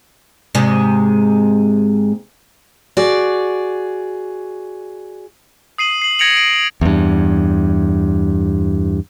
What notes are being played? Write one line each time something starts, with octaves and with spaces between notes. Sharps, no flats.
G#2 C3 G#3
F#4 G#4 D5
D#6 C7 D#7 F#7
C7 F#7
G#6 A#6 C#7 D7 F7 F#7
D7 F#7
E2 G2